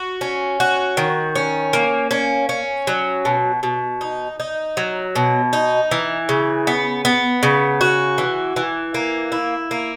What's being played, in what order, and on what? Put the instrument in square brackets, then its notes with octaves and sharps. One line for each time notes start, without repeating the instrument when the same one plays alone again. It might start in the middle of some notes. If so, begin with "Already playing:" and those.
Already playing: [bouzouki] F#4
C#4
F#4
D#3
C#4
A#3
C#4
C#4
F#3
B2
B2
D#4
D#4
F#3
B2
D#4
E3
C#3
B3
B3
C#3
F#4
E3
E3
A#3
E4
A#3